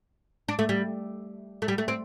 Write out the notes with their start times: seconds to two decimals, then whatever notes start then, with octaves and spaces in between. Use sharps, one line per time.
0.48 D4
0.59 A3
0.69 G3
1.62 A3
1.68 G3
1.78 A3
1.88 C4